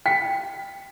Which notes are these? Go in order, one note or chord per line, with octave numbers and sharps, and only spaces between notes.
G5 B6